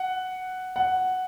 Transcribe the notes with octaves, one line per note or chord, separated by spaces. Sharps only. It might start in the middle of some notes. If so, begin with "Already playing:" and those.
Already playing: F#5
F#5